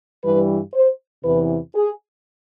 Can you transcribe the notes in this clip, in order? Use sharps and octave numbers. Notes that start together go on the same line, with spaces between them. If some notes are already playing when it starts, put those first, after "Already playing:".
G2 E3 G3 B4
C5
E2 C3 E3 B4
G#4